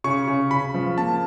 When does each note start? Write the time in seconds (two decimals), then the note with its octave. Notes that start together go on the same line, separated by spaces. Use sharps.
0.04 C#3 C#6
0.27 C#3
0.51 C#3 B5
0.74 F3
0.98 A#3 A5